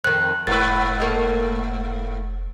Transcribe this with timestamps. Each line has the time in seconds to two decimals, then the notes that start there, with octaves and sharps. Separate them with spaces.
0.04 F2 D#3 F#6
0.47 F1 G#2 A#3 B4 A6
1.00 A3 A#3 D#5